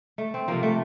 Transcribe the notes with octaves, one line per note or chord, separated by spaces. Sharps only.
A3
C4
C3 F3 A#3
A3